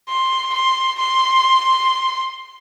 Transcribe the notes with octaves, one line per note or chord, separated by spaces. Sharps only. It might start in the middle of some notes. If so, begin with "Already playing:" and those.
C6
C6
C6